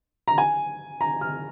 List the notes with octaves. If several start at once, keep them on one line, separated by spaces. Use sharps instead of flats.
A#5
G#5
A#5
F6